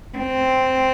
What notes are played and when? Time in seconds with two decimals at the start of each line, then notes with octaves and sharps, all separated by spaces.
0.18 C4